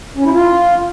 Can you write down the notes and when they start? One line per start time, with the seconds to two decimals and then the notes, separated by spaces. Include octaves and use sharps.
0.17 C#4
0.24 E4
0.32 F4